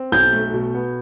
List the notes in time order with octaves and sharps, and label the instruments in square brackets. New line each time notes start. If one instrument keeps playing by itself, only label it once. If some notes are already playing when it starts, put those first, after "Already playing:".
Already playing: [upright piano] C4
[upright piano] B1 [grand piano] G6
[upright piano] A3
B2
B3